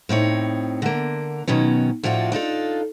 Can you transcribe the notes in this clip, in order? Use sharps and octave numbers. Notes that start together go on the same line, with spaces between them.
A2 C4 D#4 C#5
D3 A#3
B2 D#3 F#3 C#4
A2 F3 D4 F4 F#4
D4 D#4 F4 A4